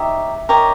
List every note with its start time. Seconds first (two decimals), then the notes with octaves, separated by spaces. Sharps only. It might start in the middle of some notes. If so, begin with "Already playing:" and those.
Already playing: D#4 G4 C#5 E5
0.49 D#4 G4 A#4 C#5